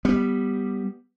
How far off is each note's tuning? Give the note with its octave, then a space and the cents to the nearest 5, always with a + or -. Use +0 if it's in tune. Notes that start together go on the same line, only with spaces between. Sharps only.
G3 +0 B3 +0